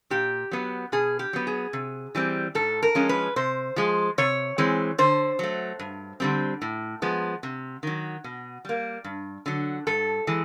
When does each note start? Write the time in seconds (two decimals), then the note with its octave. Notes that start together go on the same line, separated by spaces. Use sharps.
0.10 A#2 G4
0.51 F#3 B3
0.92 B2 G#4
1.19 G4
1.33 F#3 B3
1.47 G#4
1.73 C3
2.15 E3 G3 C4
2.55 G#2 A4
2.83 A#4
2.95 F3 G#3 C#4
3.09 B4
3.36 C3 C5
3.76 F3 G#3
4.18 C3 C#5
4.58 E3 G#3 C4
4.98 D3 C5
5.39 F#3 A3
5.79 G2
6.20 D3 G3 C4
6.62 A2
7.02 F3 G#3 B3
7.43 C3
7.83 D#3 F#3
8.24 B2
8.65 G3 A#3
9.04 G2
9.46 D3 F#3
9.87 G2 A4
10.27 E3 G#3